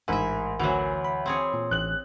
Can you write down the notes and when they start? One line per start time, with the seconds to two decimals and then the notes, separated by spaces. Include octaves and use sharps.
0.08 A1 G#2 E4 A#4 E5 G#5
0.59 D2 E3 F#3
1.05 B5
1.26 C4 G#4 C#5
1.54 A#2
1.71 A1 F#6 F#7